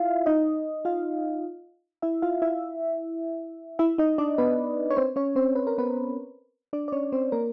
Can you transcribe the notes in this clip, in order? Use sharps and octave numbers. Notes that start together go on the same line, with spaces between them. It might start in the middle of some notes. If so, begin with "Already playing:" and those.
Already playing: E4 F4 E5 F5
D#4 D#5
F4 F5
E4 E5
F4 F5
E4 E5
E4 E5
D#4 D#5
D4 D5
B3 B4
C#5
C4 C5
C#4 C#5
C4 C5
B4
A#4
B3 B4
D4 D5
D5
C#4 C#5
C4 C5
A#3 A#4